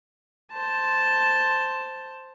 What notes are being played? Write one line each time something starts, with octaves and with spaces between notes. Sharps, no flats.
C5 A5